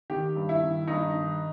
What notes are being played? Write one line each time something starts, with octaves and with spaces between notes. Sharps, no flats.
D#3 G4
G2
E4
D#3
G2 D#4
D#3